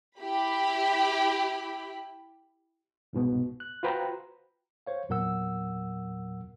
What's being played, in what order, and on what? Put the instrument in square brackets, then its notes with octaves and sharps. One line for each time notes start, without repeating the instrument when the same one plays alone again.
[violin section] E4 G4 B5
[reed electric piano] C2 G#2 B2 B3
F#6
F4 F#4 B4 C5 G5 A#5
[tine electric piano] C5 C#5 F5
E2 A#2 F#3 A#4 F#5 E6